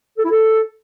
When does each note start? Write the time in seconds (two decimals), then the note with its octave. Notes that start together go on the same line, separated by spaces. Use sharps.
0.18 A4
0.24 E4
0.31 A4